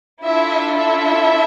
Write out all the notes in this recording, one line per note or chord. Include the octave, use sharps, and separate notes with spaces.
D4 E4 F4 A4 E5
E4 E5